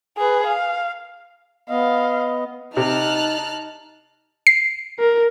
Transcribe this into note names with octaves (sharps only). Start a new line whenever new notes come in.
G#4 B4
F5
B3 D#5 F5
C3 D#4 A5 F6 F#6
C7
A#4